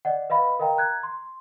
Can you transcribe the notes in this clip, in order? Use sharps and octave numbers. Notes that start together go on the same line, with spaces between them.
D5 D#5 F#5
B4 D#5 F5 B5
A#4 D#5 F5 G5 A#5
A#5 F#6 G#6
C6